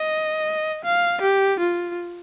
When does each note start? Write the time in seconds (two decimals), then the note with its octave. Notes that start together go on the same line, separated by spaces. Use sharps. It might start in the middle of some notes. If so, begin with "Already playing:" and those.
Already playing: D#5
0.84 F5
1.21 G4
1.60 F4